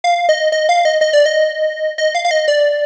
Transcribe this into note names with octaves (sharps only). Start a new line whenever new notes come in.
F5
D#5
D#5
F5
D#5
D#5
D5
D#5
D#5
F5
F5
D#5
D5